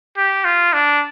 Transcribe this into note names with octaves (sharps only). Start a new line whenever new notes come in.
G4
F4
D4